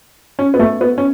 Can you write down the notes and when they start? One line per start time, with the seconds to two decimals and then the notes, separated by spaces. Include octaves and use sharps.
0.39 C#4
0.54 B3
0.59 A3
0.81 B3
0.98 C#4